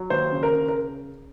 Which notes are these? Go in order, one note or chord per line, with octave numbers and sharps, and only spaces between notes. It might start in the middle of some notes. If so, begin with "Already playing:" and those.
Already playing: F#3
D#2 C5
C#3
A#4
C#3
A#4